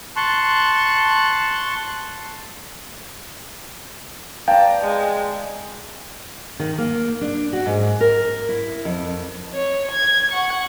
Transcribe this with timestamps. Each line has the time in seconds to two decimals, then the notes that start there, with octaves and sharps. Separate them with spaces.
0.16 A5 C6 C#6 F#6
4.48 D5 F5 G5 A5 A#5
4.81 G#3
6.59 D#3
6.78 A#3
7.21 D4
7.53 F#4
7.66 G#2
8.01 A#4
8.49 E4
8.85 F2
9.54 C#5
9.91 G#6
10.32 F#5 C#6